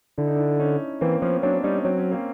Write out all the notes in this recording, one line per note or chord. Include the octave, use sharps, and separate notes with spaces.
D3 E4
D#4
D4 E4
C#4 D#4
E3 A#3 C4
F3 B3 C#4
F#3 C4 D4
G3 C#4 D#4
F#3 C4
C#4
A#3 C4